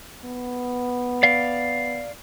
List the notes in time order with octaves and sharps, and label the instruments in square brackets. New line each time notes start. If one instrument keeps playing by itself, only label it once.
[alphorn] B3
[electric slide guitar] D5 F5